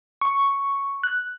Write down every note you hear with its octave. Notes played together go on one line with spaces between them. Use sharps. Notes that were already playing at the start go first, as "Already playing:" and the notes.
C#6
F#6